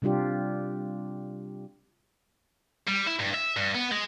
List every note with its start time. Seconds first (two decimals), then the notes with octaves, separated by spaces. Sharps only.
0.02 C3 G3 D4 F4 G4
2.88 G3
3.07 E4
3.20 G2
3.34 E5
3.57 G2
3.75 B3
3.91 G#3